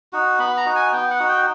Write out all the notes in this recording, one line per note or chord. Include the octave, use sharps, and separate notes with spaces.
D#4 F#4
B3 B5
A#5
D#4 F#4
G#5
B3 G5
F#5
D#4 F#4
G5